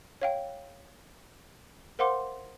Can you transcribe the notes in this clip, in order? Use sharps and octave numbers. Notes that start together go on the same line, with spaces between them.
C#5 F5 G5
A#4 C5 F5 F#5 C6 D6